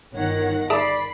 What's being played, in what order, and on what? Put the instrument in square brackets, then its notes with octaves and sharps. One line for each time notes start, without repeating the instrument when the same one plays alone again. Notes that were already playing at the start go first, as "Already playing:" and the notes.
[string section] G1 D#3 F#5 [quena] C#5
[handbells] G#4 E5 A5 [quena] D5 [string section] B5 C7